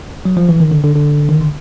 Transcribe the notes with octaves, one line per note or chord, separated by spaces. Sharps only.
F#3
F3
E3
D#3
D3
D3
D3
D#3
D3